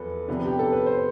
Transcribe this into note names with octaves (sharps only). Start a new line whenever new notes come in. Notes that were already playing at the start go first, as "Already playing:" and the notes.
Already playing: E2 F3 A4 B4
C3 F3 B3 D4
G4
A4
B4
C5